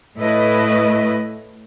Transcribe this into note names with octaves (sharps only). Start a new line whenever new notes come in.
A2 A3 E4 B4 D#5